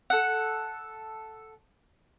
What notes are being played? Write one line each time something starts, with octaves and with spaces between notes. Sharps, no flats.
A4 F#5